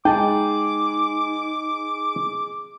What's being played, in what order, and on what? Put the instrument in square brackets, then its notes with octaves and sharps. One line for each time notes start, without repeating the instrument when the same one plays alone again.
[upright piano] G#3 G#4 [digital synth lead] D#4 [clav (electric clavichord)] G5 A5 [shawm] D6